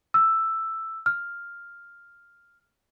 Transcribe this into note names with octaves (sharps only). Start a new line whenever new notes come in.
E6
F6